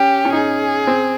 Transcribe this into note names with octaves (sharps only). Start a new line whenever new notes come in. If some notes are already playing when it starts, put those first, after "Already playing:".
Already playing: C#4 G4
C#4
D#4 G#4
C4